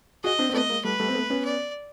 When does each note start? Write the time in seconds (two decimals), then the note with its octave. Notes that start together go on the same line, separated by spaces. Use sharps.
0.24 F#4 G#4 D#5
0.39 C4 D4
0.50 C4
0.54 A3 B3 D#5
0.69 G#3 A#3
0.84 G3 A3 B4
1.00 G3 A3
1.08 C4
1.14 A3 B3
1.30 B3 C#4
1.45 D5